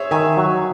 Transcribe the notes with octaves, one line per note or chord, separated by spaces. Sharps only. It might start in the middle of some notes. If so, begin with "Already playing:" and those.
Already playing: G#4 C5 C#5 E5
D#3 E5 G#5
F#3